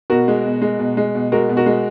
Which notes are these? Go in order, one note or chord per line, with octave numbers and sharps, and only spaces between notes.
B2 F#4 A#4
G#3
B2
G#3
B2
G#3
B2
G#3 F#4 A#4
B2
F#4 A#4
G#3